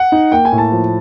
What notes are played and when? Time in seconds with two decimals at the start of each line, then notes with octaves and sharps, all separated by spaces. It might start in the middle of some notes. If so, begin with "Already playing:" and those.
Already playing: F#5
0.12 D#4
0.32 A#3 G5
0.45 G#5
0.52 A2
0.58 A5
0.72 F3